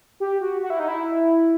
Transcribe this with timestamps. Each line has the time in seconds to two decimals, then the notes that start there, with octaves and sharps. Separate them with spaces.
0.20 G4
0.41 F#4
0.62 F#4
0.70 E4
0.80 D#4
0.88 E4